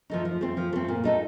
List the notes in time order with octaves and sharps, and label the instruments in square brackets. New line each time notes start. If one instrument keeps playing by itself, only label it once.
[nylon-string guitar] F3 A3 D#4
F3
A3 C4
F3
A3 C4
A#2
A3 D#4 A4